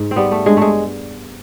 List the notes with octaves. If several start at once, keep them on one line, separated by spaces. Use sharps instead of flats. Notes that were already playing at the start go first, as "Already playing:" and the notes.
Already playing: G#2
C4
G3 B3
A3
G2 G#3
G#3 A3